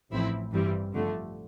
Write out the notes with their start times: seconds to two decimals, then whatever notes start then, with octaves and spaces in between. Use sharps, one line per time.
0.11 A1 A2 F3 C4 E4
0.52 G2 E3 G3 C4
0.93 F2 D3 A3